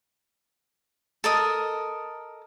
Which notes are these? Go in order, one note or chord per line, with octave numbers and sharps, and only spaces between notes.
A4 A#4 D#5